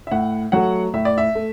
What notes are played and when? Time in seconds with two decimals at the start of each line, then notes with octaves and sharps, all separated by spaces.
0.07 E5
0.11 A2 F#5
0.52 F#3 A3 F#5
0.94 A2 E5
1.05 D5
1.18 E5
1.35 A3